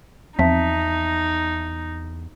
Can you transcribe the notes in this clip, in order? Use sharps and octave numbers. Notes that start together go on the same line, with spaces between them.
E2 F3 C4 D#4 E5 A5 B6